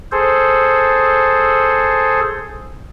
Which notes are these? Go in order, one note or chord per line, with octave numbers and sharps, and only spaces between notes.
G#4 A4 C5